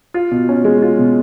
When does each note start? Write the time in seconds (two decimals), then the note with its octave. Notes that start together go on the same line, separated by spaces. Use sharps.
0.14 F4
0.31 B2
0.49 C#4
0.64 G#3
0.82 F4
0.99 B2